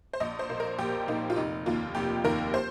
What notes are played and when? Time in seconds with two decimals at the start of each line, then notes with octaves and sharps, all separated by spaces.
0.13 C5
0.20 A#1 D#5
0.39 C5
0.50 A#2 A#3
0.60 A#4
0.79 A#1 G4
1.08 A#2 A#3 D#4
1.30 F4
1.36 F1 D#4
1.66 D#2 D#3 A#3 F4
1.95 F1 G4
2.24 D#2 D#3 A#3 A#4
2.54 C5